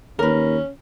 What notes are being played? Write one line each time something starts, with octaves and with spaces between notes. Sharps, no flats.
D#2 C#4 A#4 B4